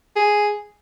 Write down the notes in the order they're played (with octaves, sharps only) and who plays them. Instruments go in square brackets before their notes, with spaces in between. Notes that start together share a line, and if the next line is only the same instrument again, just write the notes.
[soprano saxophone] G#4